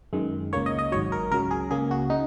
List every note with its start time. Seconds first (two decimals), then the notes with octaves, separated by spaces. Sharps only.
0.13 F#2 D#3 G#3
0.53 C#2 C#3 A#3 C#5
0.66 D#5
0.79 D#5
0.92 G#1 G#2 F#3 C#5
1.12 A#4
1.31 C#2 C#3 F#3 A#4
1.51 G#4
1.70 C#2 C#3 A#3 G#4
1.91 F#4
2.10 C#3 D#4